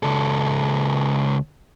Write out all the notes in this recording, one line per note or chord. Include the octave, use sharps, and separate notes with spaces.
C#2 A4